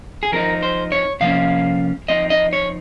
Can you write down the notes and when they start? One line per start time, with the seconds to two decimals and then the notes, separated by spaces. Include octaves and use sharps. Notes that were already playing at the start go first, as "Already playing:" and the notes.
0.23 G#4
0.32 F3 C4 D#4 A#4
0.63 C5
0.92 C#5
1.20 C3 F3 A#3 C#4 F5
2.08 F3 C4 D#4 D#5
2.30 D#5
2.53 C#5